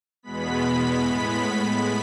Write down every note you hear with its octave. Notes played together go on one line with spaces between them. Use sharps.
E2 B2 G#3 B3 B5 B6
A2 G#3 B3 B5 B6